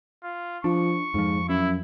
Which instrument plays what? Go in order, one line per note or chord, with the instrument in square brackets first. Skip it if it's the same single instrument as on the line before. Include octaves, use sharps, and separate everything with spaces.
[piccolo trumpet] F4
[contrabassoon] F3 [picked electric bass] D4 [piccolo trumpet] C#6
[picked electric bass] F2 F3 [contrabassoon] G#2
[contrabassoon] F#2 [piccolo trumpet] E4